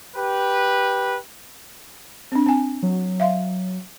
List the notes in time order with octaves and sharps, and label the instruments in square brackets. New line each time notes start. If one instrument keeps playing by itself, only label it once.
[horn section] G4 B4
[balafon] C4 D4
C4 G#5
[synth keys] F#3
[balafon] E5 F5 C6